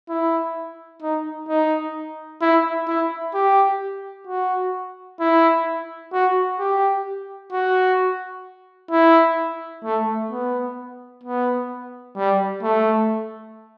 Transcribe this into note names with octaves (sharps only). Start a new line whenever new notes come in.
E4
D#4
D#4
E4
E4
G4
F#4
E4
F#4
G4
F#4
E4
A3
B3
B3
G3
A3